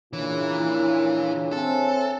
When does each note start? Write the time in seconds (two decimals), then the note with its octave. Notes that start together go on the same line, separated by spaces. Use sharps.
0.13 A#2 C#3 E3 D4 E4
1.52 C4 A4 C#5 E5 G#5